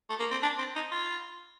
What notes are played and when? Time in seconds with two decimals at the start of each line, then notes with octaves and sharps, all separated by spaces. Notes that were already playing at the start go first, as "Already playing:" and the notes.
0.10 A3
0.20 A#3
0.31 C4
0.43 D4
0.58 C4
0.76 D#4
0.92 F4